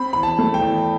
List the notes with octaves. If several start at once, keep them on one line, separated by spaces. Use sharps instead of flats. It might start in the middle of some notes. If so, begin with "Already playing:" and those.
Already playing: C4 B5
E2 B5
A5
A3
G5
E2